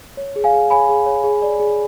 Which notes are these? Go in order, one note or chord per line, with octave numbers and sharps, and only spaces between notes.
C#5
G#4
F5 G#5
G#4
C#5 G#5 B5
G#4
C#5
G#4
D5
G#4